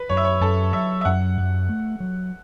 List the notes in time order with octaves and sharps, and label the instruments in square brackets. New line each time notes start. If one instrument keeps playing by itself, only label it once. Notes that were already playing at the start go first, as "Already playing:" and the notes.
Already playing: [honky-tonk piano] B4
[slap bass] F#2 [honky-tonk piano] C#5
[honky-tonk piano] E5
C#5
[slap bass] F#2 [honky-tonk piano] A4
[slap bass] F#3 [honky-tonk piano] E5
[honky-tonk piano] E5
[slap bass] F#2 [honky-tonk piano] F#5
[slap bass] F#2
A3
F#3